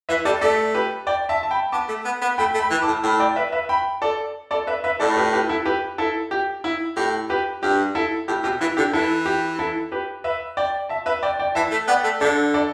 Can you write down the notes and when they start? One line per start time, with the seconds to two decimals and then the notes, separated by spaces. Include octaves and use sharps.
0.09 E3 B4 E5
0.25 G3 A4 D5
0.41 A3 A4 D5
0.74 G4 B4
1.07 D5 G5
1.29 E5 A5
1.43 A5
1.51 G5 B5
1.72 B3 A5 D6
1.88 A3
2.05 B3
2.22 B3
2.38 A3 G5 B5
2.54 A3
2.60 G5 B5
2.71 E3
2.82 A5 D6
2.87 A2
3.03 A2 G5 B5
3.20 D5 G5
3.36 B4 E5
3.52 B4 E5
3.69 G5 B5
4.02 A4 D5
4.51 A4 D5
4.67 B4 E5
4.84 B4 E5
5.00 A2 A4 D5
5.17 G4 B4
5.33 G4 B4
5.49 E4 A4
5.65 G4 B4
5.98 E4 A4
6.31 G4
6.64 E4
6.96 A2 G4
7.30 G4 B4
7.63 G2 G4
7.95 E4 A4
8.28 A2 G4
8.44 B2 G4
8.61 E3 E4
8.77 D3 G4
8.93 E3 E4 A4
9.26 G4
9.59 E4 A4
9.92 G4 B4
10.24 B4 E5
10.57 D5 G5
10.89 E5 A5
11.06 B4 E5
11.23 D5 G5
11.39 D5 G5
11.55 E3 E5 A5
11.71 A3
11.88 B3 D5 G5
12.04 A3
12.21 D3 A4 D5
12.54 A4 D5